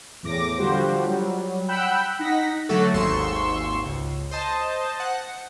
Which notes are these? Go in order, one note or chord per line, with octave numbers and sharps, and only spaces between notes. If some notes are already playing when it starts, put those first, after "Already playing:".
E2 A2 D6 A#6
D3 F3 G3 F#4 G4 C5
F#3 G3
F#5 G5 B5 E6 F#6 G6
D#4 F#5 A#6 B6
D3 F#3 A3 F#4 A4
G#1 D#2 G#2 C6 C#6 E6
C#2
C5 D#5 A5
F#5